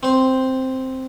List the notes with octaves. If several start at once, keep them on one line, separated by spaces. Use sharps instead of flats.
C4 C5